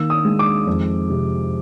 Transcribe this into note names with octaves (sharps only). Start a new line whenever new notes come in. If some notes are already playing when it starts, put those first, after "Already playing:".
Already playing: D#3 A#3 E6
D#6
G#3
D6
F2
C3